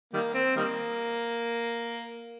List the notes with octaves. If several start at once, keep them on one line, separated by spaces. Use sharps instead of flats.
D#3 G3 A#3
C4
D#3 G3 A#3